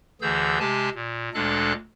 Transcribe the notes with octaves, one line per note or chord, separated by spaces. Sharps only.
D2 D3 E3 G#4 E6 G6
C3 G#3 G4 G#5 A5
A#2
D2 A#2 G#3 D4 A4 F#6